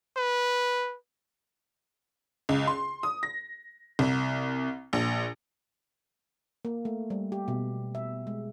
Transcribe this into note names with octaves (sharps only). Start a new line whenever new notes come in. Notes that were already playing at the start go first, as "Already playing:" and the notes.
B4
C#2
C6
D#6
A#6
C2
A#1
A#3
A3
G3
G4
B2
E5
G#3